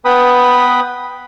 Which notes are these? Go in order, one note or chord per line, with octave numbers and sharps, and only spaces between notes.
B3 B4 G5 B5 D#6